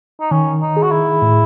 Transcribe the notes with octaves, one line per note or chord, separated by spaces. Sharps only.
D#4
D#3 C#4
D#4
G#4
F#4
E4
A2